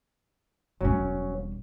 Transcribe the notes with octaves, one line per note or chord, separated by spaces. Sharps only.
E1 F#3 G3 C#4